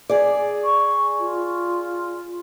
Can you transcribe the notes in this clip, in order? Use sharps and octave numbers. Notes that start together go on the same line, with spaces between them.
G#4 D5
C#6
F4